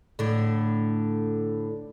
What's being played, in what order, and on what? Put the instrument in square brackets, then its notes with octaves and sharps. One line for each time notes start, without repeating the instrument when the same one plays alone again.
[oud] A2 D3